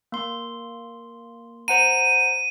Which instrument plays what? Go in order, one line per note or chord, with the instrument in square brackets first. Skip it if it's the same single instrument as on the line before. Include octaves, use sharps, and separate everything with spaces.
[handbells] A#3 C6
[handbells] C5 F#5 A#5 [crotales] D#7